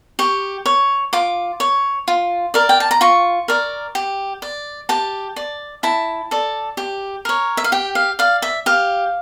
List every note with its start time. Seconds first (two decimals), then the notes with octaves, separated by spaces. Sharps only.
0.19 G4 C#6
0.66 C#5
1.13 F4 D6
1.60 C#5
2.08 F4
2.54 A#4 D5
2.69 G5
2.80 A5
2.91 A#5
3.01 F4 C#6
3.48 A#4 D5
3.95 G4
4.42 D5
4.89 G4 A5
5.36 D5
5.83 E4 A5
6.31 A4 D5
6.77 G4
7.25 A#4 C#5
7.57 E5
7.64 F5
7.72 G4 G5
7.95 F5
8.19 D5 F5
8.42 E5
8.66 G4 F5